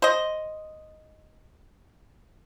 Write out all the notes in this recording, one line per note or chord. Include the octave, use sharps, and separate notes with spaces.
C5 D#5